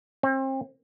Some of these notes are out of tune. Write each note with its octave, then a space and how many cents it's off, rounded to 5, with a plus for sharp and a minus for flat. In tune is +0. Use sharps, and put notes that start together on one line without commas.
C4 +35